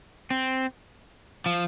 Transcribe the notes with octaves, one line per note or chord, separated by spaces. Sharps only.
C4
F3